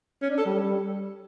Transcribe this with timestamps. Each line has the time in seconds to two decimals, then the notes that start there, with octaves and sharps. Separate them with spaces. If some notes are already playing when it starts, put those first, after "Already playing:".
0.22 C#4
0.30 D4
0.37 A4
0.45 G3